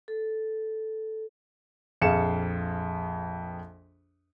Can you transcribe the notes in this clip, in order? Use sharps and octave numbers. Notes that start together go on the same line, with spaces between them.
A4
A#1 F2 G#4 F5 C#7 E7